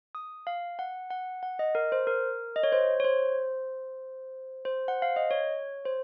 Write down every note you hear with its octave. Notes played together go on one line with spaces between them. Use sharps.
D#6
F5
F#5
F#5
F#5
D#5
A#4
C5
A#4
D#5
C#5
C5
C#5
C5
C5
F#5
F5
D#5
C#5
C5